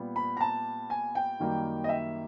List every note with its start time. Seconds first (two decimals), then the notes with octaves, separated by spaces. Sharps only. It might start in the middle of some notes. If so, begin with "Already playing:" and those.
Already playing: A#2 G3 B3
0.16 B5
0.37 A#5
0.40 A5
0.90 G#5
1.15 G5
1.40 F#2 D#3 G3 A#3
1.84 D#5
1.89 E5